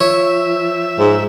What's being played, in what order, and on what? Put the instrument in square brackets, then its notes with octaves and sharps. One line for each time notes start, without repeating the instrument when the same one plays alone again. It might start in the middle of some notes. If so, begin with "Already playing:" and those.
[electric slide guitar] F3 [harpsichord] C#5 [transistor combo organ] E5
[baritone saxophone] G#2